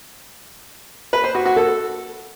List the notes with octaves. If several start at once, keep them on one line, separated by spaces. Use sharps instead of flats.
B4
C5
F#4
F#4
A4